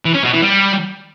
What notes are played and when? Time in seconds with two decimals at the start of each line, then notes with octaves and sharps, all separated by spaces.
0.05 E3
0.14 C#4
0.23 B2
0.32 E3
0.42 G3